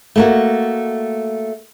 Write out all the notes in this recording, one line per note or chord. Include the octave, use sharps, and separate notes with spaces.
A3 A#3 F#4